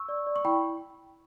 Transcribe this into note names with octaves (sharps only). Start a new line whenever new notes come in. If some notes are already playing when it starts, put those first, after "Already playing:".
Already playing: C#6 E6
D5
D5
C#6
E4 G5 B5